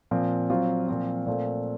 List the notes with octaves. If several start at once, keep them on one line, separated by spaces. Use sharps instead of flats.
A#2 F3 C4 F4
F#3 C4 F4
A#2 F3 C4 F4
A#2 A3 C4 F4